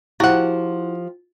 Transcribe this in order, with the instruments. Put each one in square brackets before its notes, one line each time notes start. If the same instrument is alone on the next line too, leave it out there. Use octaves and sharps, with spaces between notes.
[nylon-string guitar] F3 G4 [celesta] E4 [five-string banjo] F#4 F#5